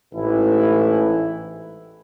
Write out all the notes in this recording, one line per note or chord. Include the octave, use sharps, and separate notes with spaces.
A1 G#2 E3 A3 E4